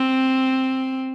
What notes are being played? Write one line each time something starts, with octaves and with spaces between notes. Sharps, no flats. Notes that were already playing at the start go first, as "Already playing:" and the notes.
Already playing: C4